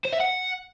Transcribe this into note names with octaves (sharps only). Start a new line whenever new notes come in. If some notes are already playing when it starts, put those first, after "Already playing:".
C5
E5
F#5